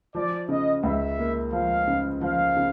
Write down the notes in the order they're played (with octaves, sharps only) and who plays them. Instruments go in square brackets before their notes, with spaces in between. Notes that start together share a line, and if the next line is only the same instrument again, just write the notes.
[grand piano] F3 [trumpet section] D5
[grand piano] C#3 [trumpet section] D#5
[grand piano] C#2 [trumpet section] E5
[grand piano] A#3
[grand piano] F3 [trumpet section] F5
[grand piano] C#3
[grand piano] F3 [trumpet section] F5
[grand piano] C#3